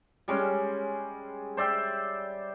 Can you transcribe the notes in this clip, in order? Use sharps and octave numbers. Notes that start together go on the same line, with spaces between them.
G3 G#3 C#4
C5 D5 E5 G5